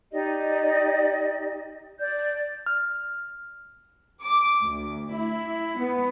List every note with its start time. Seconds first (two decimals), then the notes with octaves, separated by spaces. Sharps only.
0.12 D#4 G4 D5 D#5
2.00 D5 G6
2.66 F6
4.23 D6
4.62 D2
5.13 E4
5.77 B3